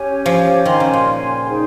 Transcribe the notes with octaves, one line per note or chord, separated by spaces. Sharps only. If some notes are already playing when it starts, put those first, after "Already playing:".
Already playing: C#4 G4 C#5 G#5
F3
D#3 C5 F5 G#5 C6
C#3
A#2
D#4 G#4 C5 G5